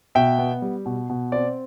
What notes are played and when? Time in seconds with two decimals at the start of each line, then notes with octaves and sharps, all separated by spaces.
0.15 B2 E5 G5
0.39 B3
0.62 G3
0.86 B2
1.10 B2
1.32 C4 D5